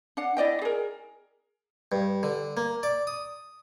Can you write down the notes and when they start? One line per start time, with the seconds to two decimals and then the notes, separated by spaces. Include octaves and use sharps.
0.17 D4 F#5
0.37 E4 D5 D#5 G5
0.62 G#4 A#4
1.92 G2
2.23 D3
2.57 A#3
2.83 D5
3.07 D#6